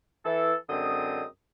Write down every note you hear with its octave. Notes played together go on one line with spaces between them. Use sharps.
E3 A4
F#2 D3 G#3 C4 D#5 D#6